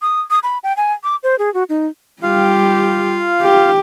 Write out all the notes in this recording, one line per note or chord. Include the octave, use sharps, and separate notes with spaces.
D#6
D#6
B5
G5
G#5
D6
C5
G#4
F#4
D#4
G3 F4 G4 F5
G4